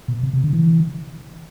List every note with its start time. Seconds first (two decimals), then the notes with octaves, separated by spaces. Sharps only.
0.08 B2
0.23 C3
0.33 C3
0.44 D3
0.53 E3